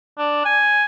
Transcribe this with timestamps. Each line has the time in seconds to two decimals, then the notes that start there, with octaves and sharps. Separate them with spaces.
0.18 D4
0.45 G#5